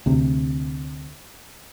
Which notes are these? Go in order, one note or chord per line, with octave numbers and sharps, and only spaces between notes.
D2 C3